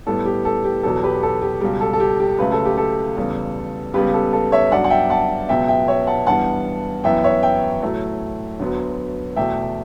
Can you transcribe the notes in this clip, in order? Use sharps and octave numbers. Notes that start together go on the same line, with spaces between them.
A2 G3 B3 A4
G4
A4
G4
E2 B2 F#3 B3 A4
G4 B4
A4
G4
C#2 B2 G3 G4
A4
A4
G4
G4
C#2 C#3 F#3 A3 B4
A4
G4
A4
E2 C#3 G3 B3
C#2 C#3 G3 B3 G4 B4
A4
A4
C#5 E5
G2 F#3 B3 D5 F#5
F#5
E5 G5
F#5 A5
C#2 B2 F#3 B3 E5 G5
E5 G5
C#5 E5
F#5 A5
G2 E3 G3 B3 F#5 A5
F#2 E3 B3 E5 G5
C#5 E5
E5 G5
A2 F#3 A3
D2 D3 F#3 B3
E2 B2 A3 E5 G5